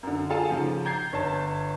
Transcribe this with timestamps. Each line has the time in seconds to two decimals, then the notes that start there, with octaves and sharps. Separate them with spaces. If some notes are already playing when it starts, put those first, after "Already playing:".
0.03 F#2 D3
0.30 F4 G#4 A4 F5 G#5 A5
0.50 G#2 C#3 F3
0.85 A#5 G6 G#6 C7
1.13 G1 C#5 A5